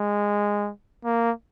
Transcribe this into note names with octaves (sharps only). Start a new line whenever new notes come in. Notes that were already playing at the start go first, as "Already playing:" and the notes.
Already playing: G#3
A#3